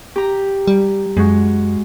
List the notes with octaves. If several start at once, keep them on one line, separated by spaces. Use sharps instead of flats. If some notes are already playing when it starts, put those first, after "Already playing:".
G4 A#5
G3
F#2 G#3 F#4